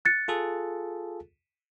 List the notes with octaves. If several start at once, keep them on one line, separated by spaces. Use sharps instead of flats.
F#6 A6 C#7
F4 G#4 A4